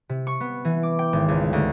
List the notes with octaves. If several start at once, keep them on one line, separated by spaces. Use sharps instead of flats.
C3
C#6
B3
E3
D6
G5
G#1
C#2
D2